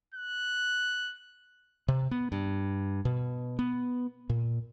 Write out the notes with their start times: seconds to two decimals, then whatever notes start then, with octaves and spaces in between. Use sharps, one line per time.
0.14 F#6
1.88 C3
2.11 B3
2.32 G2
3.05 B2
3.59 B3
4.29 A#2